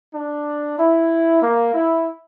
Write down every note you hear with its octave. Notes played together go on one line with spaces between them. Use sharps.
D4
E4
A#3
E4